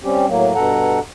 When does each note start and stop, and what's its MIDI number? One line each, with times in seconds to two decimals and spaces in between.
0.04 0.26 55
0.04 0.26 60
0.04 0.26 61
0.04 0.26 67
0.28 0.53 45
0.28 0.53 54
0.28 0.53 58
0.55 1.00 43
0.55 1.00 47
0.55 1.00 69
0.55 1.00 78
0.55 1.00 82